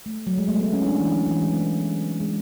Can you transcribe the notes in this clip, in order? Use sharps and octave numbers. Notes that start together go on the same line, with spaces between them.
A3
F#3
G#3
A3
B3
C#4
E4
D4
E3
E3
G#3
B3
G#3